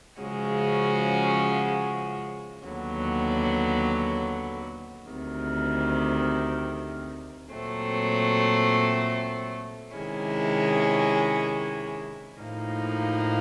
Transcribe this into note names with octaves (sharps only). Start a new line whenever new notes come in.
C#3 F3 G#3 C#4 F#4
D#2 D3 F#3 B3
D2 C3 D#3
A#2 F#3 A3 C4
C3 D#3 G#3 C#4 E4
A2 F3 A#3 D#4